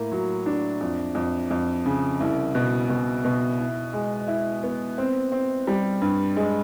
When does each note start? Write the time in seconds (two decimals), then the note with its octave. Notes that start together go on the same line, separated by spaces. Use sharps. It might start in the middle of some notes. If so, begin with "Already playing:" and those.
Already playing: A2 A#3
0.11 F#3
0.46 D4
0.81 F2
1.15 F2
1.51 F2
1.86 C#3
2.20 C2
2.55 B2
2.89 B2
3.24 B2
3.59 E4
3.93 G#3
4.28 E4
4.63 B3
4.98 C4
5.32 C4
5.67 G3
6.02 G2
6.36 G#3